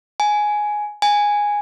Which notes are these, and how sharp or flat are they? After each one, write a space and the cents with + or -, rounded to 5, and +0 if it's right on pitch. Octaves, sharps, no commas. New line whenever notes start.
G#5 +10
G#5 -5